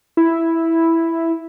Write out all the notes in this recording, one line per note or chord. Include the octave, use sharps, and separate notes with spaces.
E4